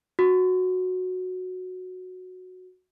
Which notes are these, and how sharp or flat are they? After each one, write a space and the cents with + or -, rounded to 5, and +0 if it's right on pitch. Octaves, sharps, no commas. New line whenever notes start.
F#4 -10